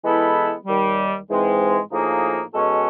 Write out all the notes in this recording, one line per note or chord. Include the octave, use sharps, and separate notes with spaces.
E3 G#3 B3 E4 A4
D#2 D#3 G3
G#2 E3 G#3 C4
A2 F3 A#3 D#4 G#4
B2 G#3 C#4 F#4 A4